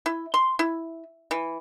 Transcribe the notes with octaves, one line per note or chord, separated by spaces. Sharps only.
E4
C6
E4
E3